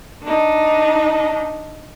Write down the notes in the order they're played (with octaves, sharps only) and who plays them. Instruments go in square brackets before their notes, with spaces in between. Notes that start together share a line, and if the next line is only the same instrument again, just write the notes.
[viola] D4 D#4